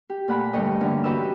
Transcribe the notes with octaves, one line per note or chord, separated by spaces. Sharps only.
G4
A#2 A3 F#5 B5
G2 D3 A3 C#5 D#5 G5
D3 E3 A#3 C#4
F#4 G4 B4 C#5 D#5 E6